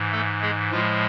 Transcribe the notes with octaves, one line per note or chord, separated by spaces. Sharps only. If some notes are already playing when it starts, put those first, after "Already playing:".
Already playing: G#2 E3
A3 A4
G#3 G#4
A2 F3 G#3 F4